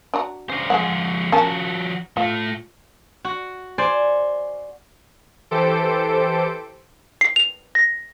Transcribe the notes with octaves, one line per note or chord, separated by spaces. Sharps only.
D4 F#4 A#5
C#4 D4 C5
F3 G#3 G#4 F5 F#5
F3 C#4 F#4 A#4 A5
A2 A3 F4
F#4
C5 D5 G#5
E3 G4 A4 C5 D7
C7
F7
A#6